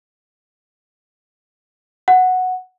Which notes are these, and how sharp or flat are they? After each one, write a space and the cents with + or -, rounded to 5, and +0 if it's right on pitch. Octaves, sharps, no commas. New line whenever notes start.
F#5 -5